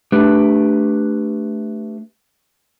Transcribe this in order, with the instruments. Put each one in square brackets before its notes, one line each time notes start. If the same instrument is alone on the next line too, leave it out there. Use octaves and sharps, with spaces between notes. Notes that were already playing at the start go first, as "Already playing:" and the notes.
[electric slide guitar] A3 D4 G4 B4